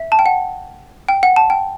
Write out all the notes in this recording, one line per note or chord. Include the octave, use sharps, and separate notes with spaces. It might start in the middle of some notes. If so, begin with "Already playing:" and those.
Already playing: E5
A5
G5
F#5
G5
F#5
A5
G5